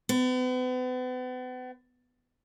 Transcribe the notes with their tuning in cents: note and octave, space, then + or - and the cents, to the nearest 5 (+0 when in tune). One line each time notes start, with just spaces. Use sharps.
B3 +40